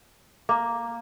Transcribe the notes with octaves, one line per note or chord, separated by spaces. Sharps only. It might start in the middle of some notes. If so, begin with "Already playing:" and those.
A#3 D6